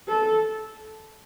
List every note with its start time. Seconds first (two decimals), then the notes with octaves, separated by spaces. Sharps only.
0.08 A4